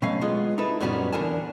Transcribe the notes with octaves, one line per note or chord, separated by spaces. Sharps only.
B2 F#3 A3 C#4 F5
G#3 B3 F4 D#5
D#4 E4 A4 B4
F#2 A#2 G3 B3 C#4 F#4
E2 D3 A#4 G#5 A5